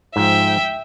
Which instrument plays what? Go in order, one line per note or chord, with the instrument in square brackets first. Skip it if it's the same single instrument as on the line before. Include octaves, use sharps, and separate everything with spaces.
[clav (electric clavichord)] G#2 F3 [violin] E5 G5